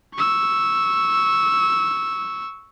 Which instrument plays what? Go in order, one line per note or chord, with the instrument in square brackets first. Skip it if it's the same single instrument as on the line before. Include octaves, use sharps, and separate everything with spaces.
[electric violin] C#6 E6